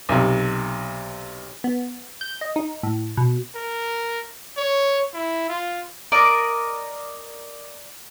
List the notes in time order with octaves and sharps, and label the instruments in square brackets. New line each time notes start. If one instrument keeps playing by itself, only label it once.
[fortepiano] B1 C3
[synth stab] B3
G6
D#5
D#4
A2
B2
[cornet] A#4
C#5
E4
F4
[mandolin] A#4 D5 D#5